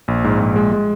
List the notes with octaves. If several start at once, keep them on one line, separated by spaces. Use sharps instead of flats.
A#1
G#2
A#1
G#3
G#3